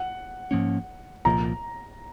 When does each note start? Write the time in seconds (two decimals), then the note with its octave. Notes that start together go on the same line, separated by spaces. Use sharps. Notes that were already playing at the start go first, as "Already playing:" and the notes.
Already playing: F#5
0.51 G#2 F3 A#3 C#4
1.25 C2 A#2 F3 A#3 A#5